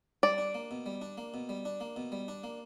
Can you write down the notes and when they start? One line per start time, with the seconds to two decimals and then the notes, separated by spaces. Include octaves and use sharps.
0.23 G3 D5
0.38 D4
0.55 A#3
0.71 B2
0.86 G3
1.02 D4
1.18 A#3
1.34 B2
1.49 G3
1.65 D4
1.81 A#3
1.96 B2
2.12 G3
2.28 D4
2.44 A#3